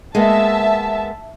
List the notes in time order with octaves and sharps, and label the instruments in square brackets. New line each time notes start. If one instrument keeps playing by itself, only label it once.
[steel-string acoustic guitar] G#3 A#3 B3 [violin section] E5 A5